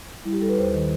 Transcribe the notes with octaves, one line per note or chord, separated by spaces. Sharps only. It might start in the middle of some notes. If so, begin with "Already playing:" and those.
G3 E4
G4
G3 A4
B4
D#2 C5
D#3